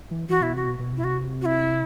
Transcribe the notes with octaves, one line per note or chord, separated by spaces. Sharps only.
E3
E3 F#4
B2 E4
C3 F#4
B2
B2
C3
B2 E4
C3 F#4
F#4
E4